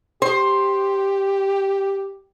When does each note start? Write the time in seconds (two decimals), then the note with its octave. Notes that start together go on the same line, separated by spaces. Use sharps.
0.22 G4 C5